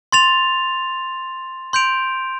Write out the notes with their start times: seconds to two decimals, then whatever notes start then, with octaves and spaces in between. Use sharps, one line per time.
0.12 C6 A6 F7
1.73 C6 G6 D7 F7